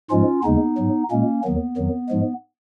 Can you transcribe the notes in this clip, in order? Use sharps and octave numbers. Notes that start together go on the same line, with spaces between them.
G#2 F3 G#3 C#4 F4
D#2 C#3 G#3 B3 D#4
G#2 F#3
A#2 G#3 A#3 C#4
D#2 D#3 F#3 B3
F2 D#3 F#3
G#2 F3 G#3